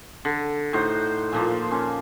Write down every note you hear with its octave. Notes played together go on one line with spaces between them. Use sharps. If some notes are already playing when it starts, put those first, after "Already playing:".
D3
A2 D#4 F#4 C5
A#2 F3 A#3
C#4